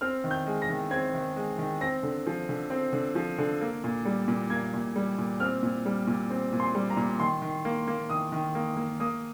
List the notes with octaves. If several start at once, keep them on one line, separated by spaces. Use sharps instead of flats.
C4 F6
D#3
G6
G#3
A#6
D#3
C4 G#6
D#3
G#3
D#3
C4 A#6
D3
F3
D3
C4
D3
F3
D3
A#3
A#2
G3
A#2
A#3 G#6
A#2
G3
A#2
C4 F6
A#2
G3
A#2
C4
A#2
C6
G3
A#5
A#2
D#3 C6
D#3
A#3
A#3
D#3 D#6
D#3
A#3
A#3
A#3 D#6